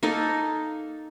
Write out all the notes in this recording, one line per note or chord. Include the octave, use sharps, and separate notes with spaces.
A#3 D#4 A4